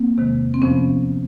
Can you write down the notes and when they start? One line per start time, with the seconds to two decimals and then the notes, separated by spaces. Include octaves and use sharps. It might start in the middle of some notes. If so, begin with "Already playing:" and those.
Already playing: A#3 C4
0.16 E2 C3 D#3 G#3
0.54 C4
0.62 F2 C3 F3 B3 C#4